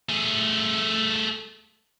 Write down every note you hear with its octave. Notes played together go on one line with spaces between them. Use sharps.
A3 G#4